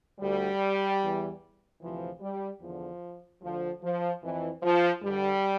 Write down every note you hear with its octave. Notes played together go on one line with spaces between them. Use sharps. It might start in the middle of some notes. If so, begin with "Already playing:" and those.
D2 D3 G3
E2 E3
D2 C3 E3 F3
G3
E2 D3 F3
D2 D3 F3
F3
F2 E3
F3
G2 D3 G3